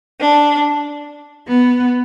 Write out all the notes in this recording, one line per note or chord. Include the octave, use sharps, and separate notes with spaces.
D4
B3